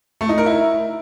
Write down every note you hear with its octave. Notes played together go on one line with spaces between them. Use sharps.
A3
D#4
A#4
E4